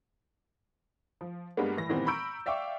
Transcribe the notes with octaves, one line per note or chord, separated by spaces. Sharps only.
F3
G2 G3 G#3 A#3 B3
A2 E3 A#6
A#2 D#3 E3 G3 B3 C4
A#5 B5 C#6 E6 G6 D7
D5 E5 F5 G5 C#6 D6